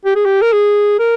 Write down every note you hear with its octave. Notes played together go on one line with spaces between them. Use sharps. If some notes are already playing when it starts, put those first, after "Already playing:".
G4
G#4
G4
A#4
G#4
A#4